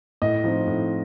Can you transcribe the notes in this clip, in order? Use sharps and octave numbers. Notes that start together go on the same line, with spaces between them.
A2 D#5
F3 C4 D#4
A2